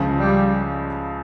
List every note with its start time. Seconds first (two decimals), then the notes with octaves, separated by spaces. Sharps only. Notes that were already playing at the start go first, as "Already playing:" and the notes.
Already playing: C#2 C#3 F3
0.17 G3